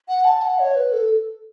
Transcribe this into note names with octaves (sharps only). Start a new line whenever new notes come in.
F#5
A5
F#5
C#5
B4
A4